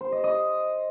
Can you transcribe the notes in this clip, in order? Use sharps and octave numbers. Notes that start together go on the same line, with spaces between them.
C5
D#5
D#5